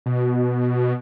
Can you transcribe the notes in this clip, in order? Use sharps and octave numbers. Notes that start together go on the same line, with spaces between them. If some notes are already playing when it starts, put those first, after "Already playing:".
B2